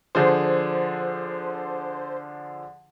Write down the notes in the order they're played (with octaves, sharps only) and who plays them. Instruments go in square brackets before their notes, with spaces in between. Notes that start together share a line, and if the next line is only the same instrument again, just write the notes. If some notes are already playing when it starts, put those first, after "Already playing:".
[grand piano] D3 F3 G#4 [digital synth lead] C5